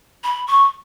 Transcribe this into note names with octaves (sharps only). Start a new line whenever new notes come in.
B5
C#6